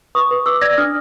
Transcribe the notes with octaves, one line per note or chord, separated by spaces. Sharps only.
B4 C#6 D#6
B4
B4 D6 E6
D5 G#6 A#6
D4 D#6 F6